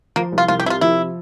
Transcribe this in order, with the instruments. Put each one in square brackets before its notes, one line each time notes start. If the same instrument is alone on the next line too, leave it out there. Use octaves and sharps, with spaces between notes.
[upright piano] F3 [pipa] A#3
[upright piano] C2
[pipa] F4
[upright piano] C2 [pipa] F4
[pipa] G4
[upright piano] C3 [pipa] E4
[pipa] F4
[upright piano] F3 [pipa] E4